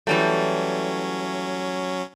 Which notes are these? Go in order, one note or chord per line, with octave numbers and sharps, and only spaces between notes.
E3 F#3 G3 A3 C#4